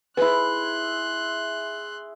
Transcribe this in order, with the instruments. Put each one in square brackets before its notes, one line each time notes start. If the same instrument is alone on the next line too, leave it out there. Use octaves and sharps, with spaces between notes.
[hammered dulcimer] E4 G#4 [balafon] B4 [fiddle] C6 F#6